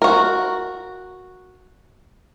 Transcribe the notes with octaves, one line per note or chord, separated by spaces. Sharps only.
F#4 A#4